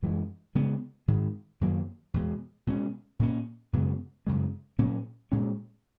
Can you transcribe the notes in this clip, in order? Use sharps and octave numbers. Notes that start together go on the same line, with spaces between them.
F#2 E3 G#3
C#3 G#3 B3
G#2 D#3 G#3
F#2 D#3 F#3 A#3
E2 B2 G#3
B2 G#3 C#4
A#2 A#3 C#4
F#2 C#3 G#3 B3
F#2 C#3 G#3
A#2 F#3 A#3 C#4
A#2 G#3 C#4